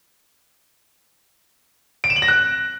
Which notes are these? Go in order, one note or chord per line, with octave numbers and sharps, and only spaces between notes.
D7
E7
F#7
A#6
F#6